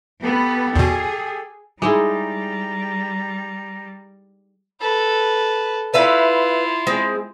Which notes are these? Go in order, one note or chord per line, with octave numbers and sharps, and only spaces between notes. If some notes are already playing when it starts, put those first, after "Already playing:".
B3 G4 A4
E2 B2 G#4
G3 G#3 D#4 E4 G#4 A#5
A4 B4
E4 F4 B4 E5 F5
G#3 C4